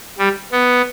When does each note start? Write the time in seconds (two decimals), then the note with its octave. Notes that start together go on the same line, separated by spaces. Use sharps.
0.18 G3
0.52 B3